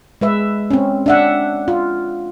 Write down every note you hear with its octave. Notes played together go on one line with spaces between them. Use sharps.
G#3 B4 E5
C4 C#4
D4 E5 F#5
F4